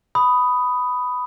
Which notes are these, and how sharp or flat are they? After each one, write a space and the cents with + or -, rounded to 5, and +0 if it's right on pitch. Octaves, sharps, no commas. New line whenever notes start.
B5 +10 D#6 +0